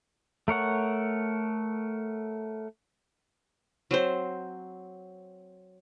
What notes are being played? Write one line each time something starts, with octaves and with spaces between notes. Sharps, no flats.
A3 A#4 C#5 F#5
F#3 C4 C5